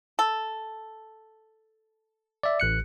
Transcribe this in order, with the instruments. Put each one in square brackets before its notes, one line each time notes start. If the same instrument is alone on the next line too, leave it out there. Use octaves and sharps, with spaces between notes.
[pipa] A4
[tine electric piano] D5 E5
A1 F#6 C#7